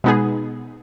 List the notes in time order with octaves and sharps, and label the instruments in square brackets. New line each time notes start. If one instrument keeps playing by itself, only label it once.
[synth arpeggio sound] B2 G#3 B3 D#4 G#4